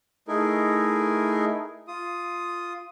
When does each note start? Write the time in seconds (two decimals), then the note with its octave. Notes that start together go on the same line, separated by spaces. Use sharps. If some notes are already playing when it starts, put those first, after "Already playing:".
0.28 A3 D#4 E4 G#4 A#4
1.88 F4 D#6